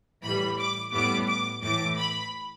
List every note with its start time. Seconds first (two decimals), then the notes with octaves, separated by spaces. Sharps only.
0.23 A2 E3 G3 B5
0.59 D6
0.93 A2 G3 B3 D6
1.28 D6
1.62 A2 E3 A3 D6
1.98 B5